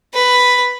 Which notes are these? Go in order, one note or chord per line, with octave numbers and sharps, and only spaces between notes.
B4